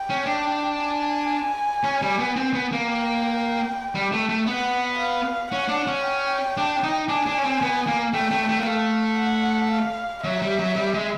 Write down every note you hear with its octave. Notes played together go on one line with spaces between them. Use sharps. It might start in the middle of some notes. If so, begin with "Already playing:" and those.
Already playing: G5
C#4
D4
G#5
C#4
G3
B3
C4
B3
A#3
G5
G3
A3
A3
B3 F#5
F5
C#4 F#5
D4
C#4
G5
D4
D#4
D4 G#5
D4
C#4
C4
B3
A#3
A3 G5
A3
A3
A#3
A3 F5
F#5
F5
F#3 E5
G3
F#3
G3
G#3